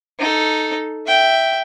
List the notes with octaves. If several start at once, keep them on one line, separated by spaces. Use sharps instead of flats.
D#4 A4
E5 G5